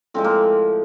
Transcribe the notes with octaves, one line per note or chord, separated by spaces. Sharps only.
A2 F3 G#3 C4
A#3